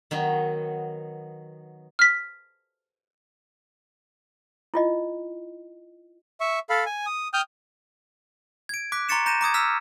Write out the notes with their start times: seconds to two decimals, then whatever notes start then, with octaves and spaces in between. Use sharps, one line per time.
0.11 D#3 F#3 B3
1.99 F6 B6
4.74 E4 F4 D#5
6.40 E5 C#6
6.70 A4 F5 B5
6.86 G#5
7.06 D#6
7.34 G5 D#6 F6 G6
8.69 G#6 D7
8.92 D6 F#6 B6
9.09 A#5 C6 C#6 A6 C#7 E7
9.26 A#5 G6 A#6 D#7 E7
9.41 A#5 D6 D#6 G#6
9.54 A#5 E6 F6 B6